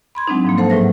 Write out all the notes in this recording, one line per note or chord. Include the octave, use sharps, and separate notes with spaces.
B5 C6 G#6
F#3 G#3 C4 D4 D#4
G#2 F3 A#3
A4 C5 F#5 A5
A2 F#3 G#4 B4 E5 A#6